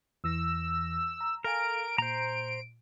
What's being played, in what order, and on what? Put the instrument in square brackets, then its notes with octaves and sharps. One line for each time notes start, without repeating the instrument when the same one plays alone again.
[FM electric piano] E2 E3 A#6 [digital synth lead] E6
[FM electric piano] A#5
[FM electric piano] A4 F5 G#5 [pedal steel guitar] A#4 [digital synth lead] D7
[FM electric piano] A#2 [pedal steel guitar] C5 A#5